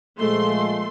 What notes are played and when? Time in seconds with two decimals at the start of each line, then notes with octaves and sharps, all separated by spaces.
0.19 A#2 F3 G#3 A3 C6